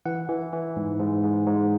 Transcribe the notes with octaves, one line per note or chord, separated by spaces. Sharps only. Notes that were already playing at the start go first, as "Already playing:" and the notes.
E3 F#5
E3
E3
G#2
G#2
G#2
G#2